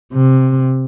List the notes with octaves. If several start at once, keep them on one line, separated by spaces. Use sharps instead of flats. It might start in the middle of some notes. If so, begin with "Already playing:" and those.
C3